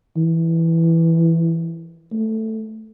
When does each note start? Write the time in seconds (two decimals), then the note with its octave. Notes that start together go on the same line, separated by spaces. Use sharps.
0.17 E3
2.13 A3